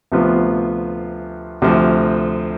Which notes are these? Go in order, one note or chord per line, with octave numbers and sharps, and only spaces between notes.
D2 C3 F3 B3 F4
D2 C3 F3